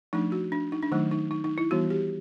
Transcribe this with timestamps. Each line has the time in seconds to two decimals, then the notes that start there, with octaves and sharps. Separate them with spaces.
0.13 F3 A3 D4 D#4
0.32 F#4
0.52 D4
0.72 D#4
0.82 D4
0.92 D#3 F#3 A3 D#4
1.11 D#4
1.31 D#4
1.44 D#4
1.58 E4
1.71 E3 G3 B3 F#4
1.90 G4